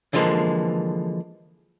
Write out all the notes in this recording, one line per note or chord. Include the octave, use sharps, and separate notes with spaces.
D3 E3 F3 G#3 A#3